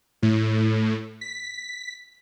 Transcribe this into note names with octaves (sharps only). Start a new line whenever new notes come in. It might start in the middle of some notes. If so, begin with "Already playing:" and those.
A2
B6